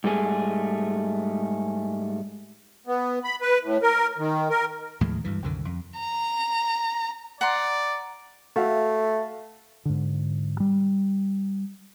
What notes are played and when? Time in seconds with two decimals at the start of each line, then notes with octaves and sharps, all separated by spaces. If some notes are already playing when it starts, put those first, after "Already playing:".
0.04 G#2 G3 A3 G#4
2.87 B3
3.24 B5
3.41 B4
3.63 A2
3.83 A#4
4.18 D#3
4.50 A#4
5.01 D#2 A2 F3 G#3
5.24 D2 G2 E3
5.42 C2 F#2 D3 D#3
5.65 F2
5.99 A#5
7.41 D5 F#5 A#5 C6
8.56 A3 F#4 E5 F5
9.85 G#2 D3
10.60 G3